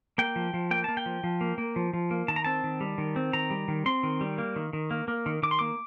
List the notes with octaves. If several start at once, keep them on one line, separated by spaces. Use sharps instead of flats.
A#3 G5
F3
F3
A#3 G5
A#3 A5
G5
F3
F3
A#3
A#3
F3
F3
A#3
D#3 A5
A#5
C4 A5
D#3
G3
D#3
C4
D#3 A#5
G3
D#3
C4 C6
D#3
G3
A#3
D#3
D#3
A#3
A#3
D#3
D#3 D6
C6
A#3 D6